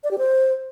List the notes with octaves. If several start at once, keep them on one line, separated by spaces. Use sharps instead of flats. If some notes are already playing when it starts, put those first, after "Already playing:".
D5
G4
C5